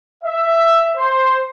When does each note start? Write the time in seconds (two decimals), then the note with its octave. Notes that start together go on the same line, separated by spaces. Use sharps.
0.24 E5
0.95 C5